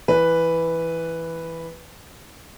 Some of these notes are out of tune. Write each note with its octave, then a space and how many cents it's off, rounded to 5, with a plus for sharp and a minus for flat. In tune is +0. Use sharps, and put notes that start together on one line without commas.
E3 +0 B4 +0